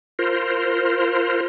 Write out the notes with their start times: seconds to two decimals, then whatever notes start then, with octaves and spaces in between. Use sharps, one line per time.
0.19 F4 A#4 C5